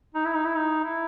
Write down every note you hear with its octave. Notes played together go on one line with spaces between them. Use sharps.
D#4
E4
D#4
E4
D#4
E4